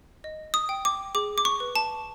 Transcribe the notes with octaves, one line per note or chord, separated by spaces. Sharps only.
D#5
D#6
G5
D6
G#4 D6
D6
C#6
B4
A5